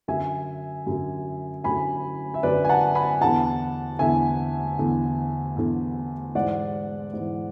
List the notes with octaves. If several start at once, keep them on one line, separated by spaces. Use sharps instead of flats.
F#2 D3 E5 G#5
F#2 D3
F#2 D3 G#5 B5
E5
F#2 D3 B4 D5
G#5
F#5 A5
G#5 B5
E2 D3 F#5 A5
E2 D3 E5 G#5
E2 D3
E2 D3
G#2 E3 D5 F#5
G#2 E3